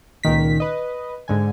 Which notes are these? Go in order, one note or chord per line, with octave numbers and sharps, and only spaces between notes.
C#2 A#2 D#3 B6
B4 D#5
G#2 D3 G#5